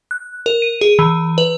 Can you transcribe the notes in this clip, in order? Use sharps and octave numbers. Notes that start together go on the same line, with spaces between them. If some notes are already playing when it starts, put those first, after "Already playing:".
F#6
A#4
D#7
G#4
E3
B4